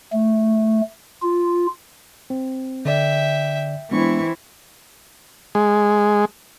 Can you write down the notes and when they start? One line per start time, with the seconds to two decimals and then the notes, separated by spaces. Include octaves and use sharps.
0.13 A3
1.22 F4
2.30 C4
2.85 D3 D5 E5 G5
3.91 E3 G#3 B3 C4 D4 E4 C#6
5.55 G#3